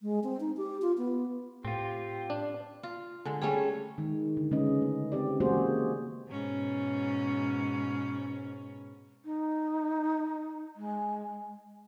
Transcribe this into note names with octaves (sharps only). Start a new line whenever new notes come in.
G#3
C4
D#4
G4
F4
B3
A2 C4 F4 G4
D4
F4
D3 G#3
G3 A3 C#4 G#4
D#3 G#3
D3
C#3 G#3 C#4 B4 D#5
A3
C4 G4 D5
E3 G#3 A#3 F#4 G#4 C5
G#2 B2 C#4
D#4
G#3